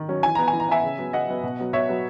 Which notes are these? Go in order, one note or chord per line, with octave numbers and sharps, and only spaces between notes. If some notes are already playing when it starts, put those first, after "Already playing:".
Already playing: D#3
F#3 C#4
E3 G#5
B3 A#5
G#5
E3
A#5
B3 E5 G#5
C#3
F#3 B3
C#3 D#5 F#5
F#3 B3
B2
F#3 B3
B2 C#5 E5
F#3 B3